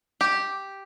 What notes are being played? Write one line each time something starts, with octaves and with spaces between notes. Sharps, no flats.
G4